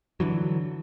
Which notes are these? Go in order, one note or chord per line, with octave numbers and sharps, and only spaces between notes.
D3 E3 F#3